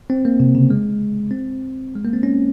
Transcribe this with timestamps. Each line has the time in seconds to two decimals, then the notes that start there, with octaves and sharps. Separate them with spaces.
0.10 C4
0.25 A#3
0.40 C3
0.55 C#3
0.70 G#3
1.31 C4
1.95 G#3
2.05 A#3
2.13 C4
2.23 C#4